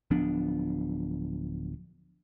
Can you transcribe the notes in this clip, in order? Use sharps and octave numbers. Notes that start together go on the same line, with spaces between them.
D1 F3 B3 D4